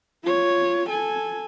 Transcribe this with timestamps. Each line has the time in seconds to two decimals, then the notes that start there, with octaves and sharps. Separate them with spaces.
0.23 F4 C#5
0.90 A4 G#5